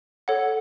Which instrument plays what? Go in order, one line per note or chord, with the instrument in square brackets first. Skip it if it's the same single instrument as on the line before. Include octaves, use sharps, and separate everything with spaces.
[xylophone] A4 C#5 F#5